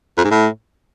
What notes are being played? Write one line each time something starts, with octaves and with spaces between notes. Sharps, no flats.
F2
G#2
A2